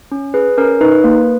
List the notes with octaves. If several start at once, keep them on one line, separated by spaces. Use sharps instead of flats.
C#4
G#4 B4
C#4 A#4
D#4 B4
A#3